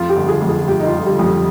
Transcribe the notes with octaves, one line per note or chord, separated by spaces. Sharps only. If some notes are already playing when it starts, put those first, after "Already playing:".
Already playing: F2 F4
G4
G1
G#4
F2
G#4
G1 G4
D#4
F4
G1
G3
F2
G3